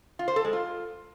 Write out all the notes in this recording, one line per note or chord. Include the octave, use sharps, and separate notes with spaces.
F4
C5
A4
G#3
F4